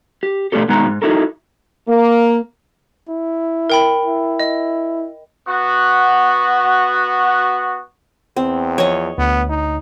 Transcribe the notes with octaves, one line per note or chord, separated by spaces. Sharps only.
G4
B2 A3 D4 D#4 G4 A4
B2 D#3 G#3 F#5 A#5
G#2
D#4 E4 F#4 A4 A#4
A#3
E4
A#4 G5 B5
E4
D#5
B3 F#4
E2 C4
F3 C#5 D#5
D2 B3
D#4